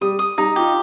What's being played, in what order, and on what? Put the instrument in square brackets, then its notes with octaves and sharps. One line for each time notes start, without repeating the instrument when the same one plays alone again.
[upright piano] G3 [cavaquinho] D#6
[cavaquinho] D#6
[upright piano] G3 [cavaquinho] D#4
[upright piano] F4 [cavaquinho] G4